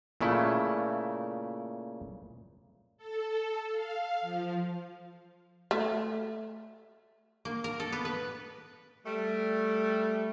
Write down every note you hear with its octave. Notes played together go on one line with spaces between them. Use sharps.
A#2 C#3 A3 E4
A4
F5
F3
A3
A#3
A#4
A4
B3
B4
G3 A3